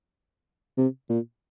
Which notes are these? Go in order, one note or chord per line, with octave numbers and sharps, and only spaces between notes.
C3
A#2